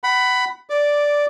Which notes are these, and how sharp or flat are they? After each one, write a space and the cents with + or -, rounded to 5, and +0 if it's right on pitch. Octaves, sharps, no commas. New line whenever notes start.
F#5 +25 B5 +10
D5 -5 D6 +0